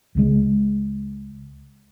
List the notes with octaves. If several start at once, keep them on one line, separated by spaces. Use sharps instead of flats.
C#2 C#3 E3 G#3